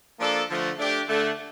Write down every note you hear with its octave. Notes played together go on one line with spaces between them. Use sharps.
F3 A#3 D4 A4
D3 F3 A3
A3 D4 G4
D3 A3 D4